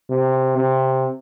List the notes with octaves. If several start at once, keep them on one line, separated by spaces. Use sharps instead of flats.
C3
C3